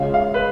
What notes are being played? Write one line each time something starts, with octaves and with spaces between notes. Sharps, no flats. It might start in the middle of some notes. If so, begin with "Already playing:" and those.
Already playing: C#3 G#3 C#4 F4 F5
F5
B4